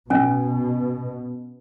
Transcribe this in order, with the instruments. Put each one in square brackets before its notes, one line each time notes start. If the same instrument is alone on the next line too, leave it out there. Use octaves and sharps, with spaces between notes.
[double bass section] B2 [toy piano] C#4 G#5